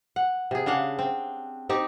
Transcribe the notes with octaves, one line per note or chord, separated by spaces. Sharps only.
F#5
C3 G#4
C#3 D4 F5 F#5
C4
C4 D#4 G4